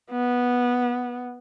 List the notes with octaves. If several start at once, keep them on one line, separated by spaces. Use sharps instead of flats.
B3